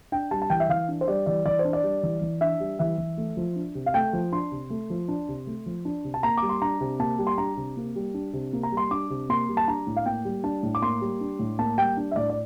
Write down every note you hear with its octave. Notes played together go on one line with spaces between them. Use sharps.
D4 G5
G3 A5
A5
E3 G5
E5
E3 F5
D4
C5
G3 D5
E3 D5
E3 D5
C5
D4
D5
G3
E3
E3
D4 E5
G3
E3 E5
E3
A3
F3
D4
C3
F5
A3 G5
F3
D4 C6
C3
A3
F3
D4
C3
A3
F3
D4
C3
A5
A#3 A#5
G3 D6
C6
D4 A#5
C3
A#3 A5
G3
C6
D4 A#5
C3
A#3
G3
D4
C3
A#3
A#5
G3
C6
D4 D6
C3
A#3 C6
G3
A5
D4 A#5
A2
F5
A#3 G5
G3
D4 A5
A2
D6
A#3 C6
G3
D4
A2
A#3 A5
G3 G5
D4
E5
A2 D5
D5